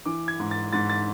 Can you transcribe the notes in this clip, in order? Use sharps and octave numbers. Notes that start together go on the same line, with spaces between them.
E3 D6
G#6
G#2
A6
G#2 A6
A6